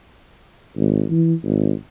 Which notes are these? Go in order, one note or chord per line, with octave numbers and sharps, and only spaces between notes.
G#1
E3
G#1